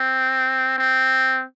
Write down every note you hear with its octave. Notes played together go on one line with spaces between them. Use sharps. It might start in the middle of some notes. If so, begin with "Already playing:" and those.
Already playing: C4
C4